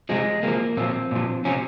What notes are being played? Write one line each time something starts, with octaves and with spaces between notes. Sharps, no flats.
C3 F3 G#3
C3 F3 A#3
A#2 F3 C4
A#2 F3
C3 F3 C#4